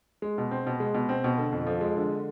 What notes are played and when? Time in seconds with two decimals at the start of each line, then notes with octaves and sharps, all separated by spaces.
0.22 G#3
0.38 B2
0.51 C4
0.67 B2
0.80 G#3
0.94 B2
1.09 C4
1.24 B2
1.38 D3
1.52 F2
1.67 F3
1.81 G#3
1.96 D3